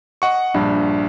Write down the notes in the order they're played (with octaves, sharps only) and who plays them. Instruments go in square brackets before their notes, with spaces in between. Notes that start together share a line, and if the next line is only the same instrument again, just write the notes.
[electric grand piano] D#5 F#5 C#6
[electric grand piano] A#1 [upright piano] G2